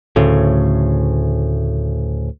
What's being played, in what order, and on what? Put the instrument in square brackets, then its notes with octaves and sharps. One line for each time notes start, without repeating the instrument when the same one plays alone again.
[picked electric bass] D2 A2 C#3